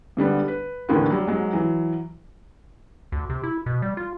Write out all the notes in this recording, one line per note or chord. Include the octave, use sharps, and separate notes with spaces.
G#2 D3 G3 B3
B4
D#2 A2 D3 E3 A#3 B3
F#3 G3
G#2 F#3 G#3
E3 F#3
D2
C3
E4
B2
G3
F4